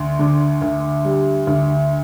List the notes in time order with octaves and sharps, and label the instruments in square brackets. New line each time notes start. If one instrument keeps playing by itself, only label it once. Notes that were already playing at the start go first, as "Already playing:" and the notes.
Already playing: [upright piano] D2
D3
D2
G3
D2